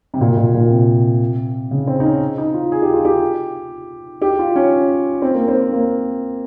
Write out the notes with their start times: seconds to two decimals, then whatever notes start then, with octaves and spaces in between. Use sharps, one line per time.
0.14 C3
0.21 A#2
0.37 A#2
0.54 A#2
0.71 C3
1.71 C#3
1.87 C4
2.00 D#4
2.05 C#4
2.38 D#4
2.54 F4
2.72 G#4
2.82 G4
2.93 F4
3.05 G4
4.22 G4
4.39 F4
4.55 C#4
5.22 C4
5.34 A#3
5.48 C4
5.72 A#3